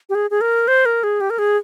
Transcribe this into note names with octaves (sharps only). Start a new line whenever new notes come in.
G4
G#4
G#4
A#4
C5
A#4
G#4
G4
A#4
G#4